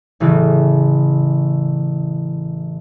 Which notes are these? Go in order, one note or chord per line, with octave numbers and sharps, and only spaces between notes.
A1 C#3 E3